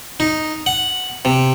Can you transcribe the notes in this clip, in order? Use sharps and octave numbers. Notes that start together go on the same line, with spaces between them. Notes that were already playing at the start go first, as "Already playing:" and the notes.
D#4
F#5
C3